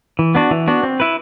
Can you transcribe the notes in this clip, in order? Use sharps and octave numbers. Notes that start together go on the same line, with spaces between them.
E3
B3 D4 F#4
E3
B3 D4 F#4
C4
E4 B4